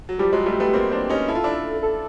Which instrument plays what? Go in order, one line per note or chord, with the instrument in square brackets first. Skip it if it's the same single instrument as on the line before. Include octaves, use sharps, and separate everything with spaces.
[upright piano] F#3
[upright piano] F3 G3 [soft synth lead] G4
[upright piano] F#3 G#3
G3 A3
A3 B3
A#3 C4
C4 D4
C#4 D#4
[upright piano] E4 [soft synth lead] A4
[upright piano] F4
D4 E4
[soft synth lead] A4